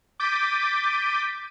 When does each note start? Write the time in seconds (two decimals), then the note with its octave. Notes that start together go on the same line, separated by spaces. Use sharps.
0.20 D6 G6 A6 B6 D7 D#7